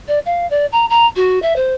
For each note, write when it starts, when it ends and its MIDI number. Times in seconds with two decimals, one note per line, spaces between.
0.08 0.19 74
0.25 0.48 77
0.50 0.66 74
0.72 0.86 82
0.90 1.06 82
1.16 1.39 66
1.42 1.53 76
1.56 1.74 72